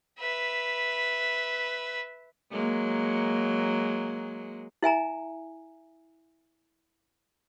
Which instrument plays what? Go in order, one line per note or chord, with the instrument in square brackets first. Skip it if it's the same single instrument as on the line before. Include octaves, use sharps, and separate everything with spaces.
[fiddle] B4 E5
[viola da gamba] F#3 G#3 A#3
[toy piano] E4 E5 G#5 A#5